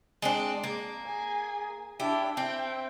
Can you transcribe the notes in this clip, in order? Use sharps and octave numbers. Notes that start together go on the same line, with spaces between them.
G#3 C4 D4
A#3
G#4 G#5
D4 E4 G4
C4 E5 G5